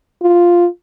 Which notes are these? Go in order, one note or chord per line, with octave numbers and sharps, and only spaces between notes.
F4